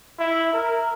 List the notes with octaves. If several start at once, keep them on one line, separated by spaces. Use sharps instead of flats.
E4
A#4